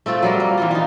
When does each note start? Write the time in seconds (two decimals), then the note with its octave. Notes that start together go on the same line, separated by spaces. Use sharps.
0.06 A3 C4 F4 A4
0.23 F#3 G3 A#4
0.40 A#3
0.58 E3 G3 F4
0.71 D#4 F4